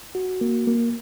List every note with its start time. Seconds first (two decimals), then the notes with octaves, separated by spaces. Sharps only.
0.15 F#4
0.41 A#3
0.67 A#3